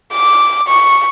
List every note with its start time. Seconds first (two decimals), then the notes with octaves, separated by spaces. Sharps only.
0.12 D6
0.68 C#6